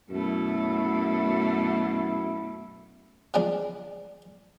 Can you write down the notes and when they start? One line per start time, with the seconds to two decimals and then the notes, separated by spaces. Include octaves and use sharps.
0.11 F#2 B2 A3 E4
3.34 C#3 F3 G3 G#3 D4